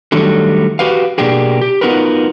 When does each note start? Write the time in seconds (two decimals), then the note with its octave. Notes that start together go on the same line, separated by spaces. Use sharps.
0.12 D#3 F#3 G3 A3 D4 A4
0.79 F#4 G4 B4 F5
1.18 B2 A#3 D4 G4 G#4
1.61 G4
1.81 B3 D#4 F4 F#4 A#4 B4